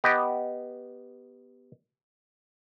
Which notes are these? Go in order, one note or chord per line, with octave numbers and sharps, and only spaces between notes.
B3 G4 D#5